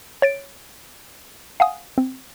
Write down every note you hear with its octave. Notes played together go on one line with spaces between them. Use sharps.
C#5 A6 D7
F5 F#5 G#5 D#6
C4